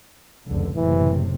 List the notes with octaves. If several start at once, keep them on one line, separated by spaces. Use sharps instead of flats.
F1 C#2 D3
F#1 A2 C3 E3